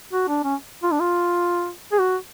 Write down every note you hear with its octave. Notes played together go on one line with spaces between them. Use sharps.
F#4
D4
C#4
F4
D4
F4
G#4
F#4